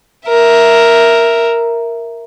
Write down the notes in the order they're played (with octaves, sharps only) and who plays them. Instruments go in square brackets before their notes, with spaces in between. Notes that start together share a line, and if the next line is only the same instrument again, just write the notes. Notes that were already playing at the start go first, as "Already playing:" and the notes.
[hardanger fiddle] A#4 E5